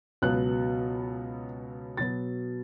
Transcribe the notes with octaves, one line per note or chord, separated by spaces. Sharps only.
C#2 B2 F#3 B3 F#6
B2 F#3 B3 A6